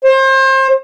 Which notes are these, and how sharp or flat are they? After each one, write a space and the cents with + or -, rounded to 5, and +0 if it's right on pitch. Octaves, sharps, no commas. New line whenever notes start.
C5 +30